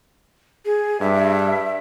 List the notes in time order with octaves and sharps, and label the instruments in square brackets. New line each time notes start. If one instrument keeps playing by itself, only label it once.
[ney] G#4
[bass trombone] G2 [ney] E5